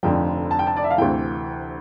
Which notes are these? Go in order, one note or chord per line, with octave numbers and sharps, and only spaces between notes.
F1 F2 D3 F3 G5
A5
G5
A5
D5
E5
F5
D2 C3 E3 G5